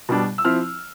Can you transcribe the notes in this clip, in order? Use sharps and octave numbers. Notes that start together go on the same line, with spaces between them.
B2 G3 D4
E6
F3 C4 E4 F6